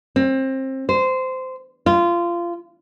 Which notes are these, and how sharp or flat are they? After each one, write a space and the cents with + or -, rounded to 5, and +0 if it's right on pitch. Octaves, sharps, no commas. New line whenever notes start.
C4 +25
C5 -15
F4 -20